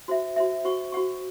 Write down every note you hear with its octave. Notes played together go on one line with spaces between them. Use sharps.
F#4 C5 E5
F#4 C5 E5
F#4 C5 F#5 C#6
F#4 C5 F#5 C#6